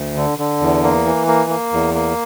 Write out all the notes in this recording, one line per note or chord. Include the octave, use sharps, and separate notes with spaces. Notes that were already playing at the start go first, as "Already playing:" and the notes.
Already playing: D2
D3
D3
E2
A#3
E3
A#3
A#3
E2
A#3